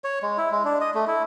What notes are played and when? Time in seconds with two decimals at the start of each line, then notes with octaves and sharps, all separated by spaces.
0.04 C#5
0.23 G#3
0.38 E4
0.52 G#3
0.65 D4
0.81 D#5
0.95 A3
1.07 E4